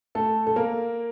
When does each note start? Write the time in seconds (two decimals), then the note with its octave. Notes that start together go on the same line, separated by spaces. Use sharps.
0.15 A3 A4
0.47 A4
0.56 A#3 A#4